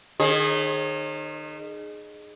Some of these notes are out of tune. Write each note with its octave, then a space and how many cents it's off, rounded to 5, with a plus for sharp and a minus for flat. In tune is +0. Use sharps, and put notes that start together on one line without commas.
D#3 -30 G#4 +10 C#5 -45